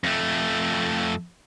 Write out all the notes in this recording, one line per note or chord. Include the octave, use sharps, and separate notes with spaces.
F2 A3